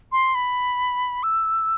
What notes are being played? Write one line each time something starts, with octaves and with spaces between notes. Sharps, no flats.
C6
B5
E6